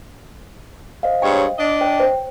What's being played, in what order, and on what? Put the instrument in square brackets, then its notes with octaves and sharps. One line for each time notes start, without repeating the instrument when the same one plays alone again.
[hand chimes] C5 D#5 F5
[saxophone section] G2 G#3 C#5 [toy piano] G5
[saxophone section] D4 D#5
[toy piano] C#5 [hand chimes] G5
[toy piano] C5